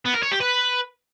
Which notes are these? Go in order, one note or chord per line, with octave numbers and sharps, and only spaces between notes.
B3
A#4
C#5
G4
B4